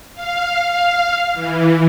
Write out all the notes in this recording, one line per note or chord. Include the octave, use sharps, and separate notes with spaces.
F5
E3